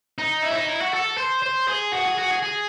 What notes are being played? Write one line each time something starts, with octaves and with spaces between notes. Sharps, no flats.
D#4
E4
C#4
D#4
E4
F#4
A4
C5
C5
G#4
F#4
G#4
F#4
G#4
G#4